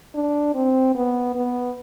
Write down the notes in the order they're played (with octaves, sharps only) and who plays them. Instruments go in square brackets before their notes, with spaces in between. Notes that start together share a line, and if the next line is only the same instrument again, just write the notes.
[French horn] D4
C4
B3
B3